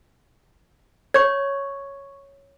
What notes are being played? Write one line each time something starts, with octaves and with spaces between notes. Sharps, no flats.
C#5 C#6 G#6